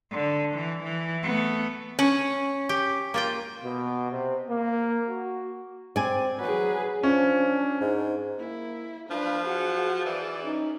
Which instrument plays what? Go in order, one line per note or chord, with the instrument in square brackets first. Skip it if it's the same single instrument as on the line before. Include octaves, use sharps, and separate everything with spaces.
[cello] D3
E3
E3
A3 B3
[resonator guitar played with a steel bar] C#4
[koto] G4 G5
A#3 F4 G5
[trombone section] B2
C3
A#3
F#4
[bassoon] C4 [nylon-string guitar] D5 G#5
[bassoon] F#3 [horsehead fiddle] G#4 B4
[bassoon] F3 [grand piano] C#4 [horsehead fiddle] D4
[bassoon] G#2
[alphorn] A#3 [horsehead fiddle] E4
[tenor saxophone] F3 [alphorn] D4 [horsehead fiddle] B4 F5
[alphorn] F#4 [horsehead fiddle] G#4 F#5
[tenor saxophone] E3 [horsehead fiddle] G#4 D5
[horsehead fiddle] C#4 [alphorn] D#4